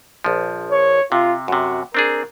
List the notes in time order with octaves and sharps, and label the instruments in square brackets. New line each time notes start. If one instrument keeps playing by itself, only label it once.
[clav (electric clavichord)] A#1 F3
[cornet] C#5
[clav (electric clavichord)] C3 [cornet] F4
[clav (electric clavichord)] F#2 C3 [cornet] F#4
[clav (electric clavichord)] C4 D4 G#4 [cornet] A#4